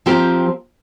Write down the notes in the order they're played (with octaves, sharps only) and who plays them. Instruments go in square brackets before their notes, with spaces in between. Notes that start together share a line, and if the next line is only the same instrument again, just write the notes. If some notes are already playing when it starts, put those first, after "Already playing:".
[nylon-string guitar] F3 C4 G4 A#4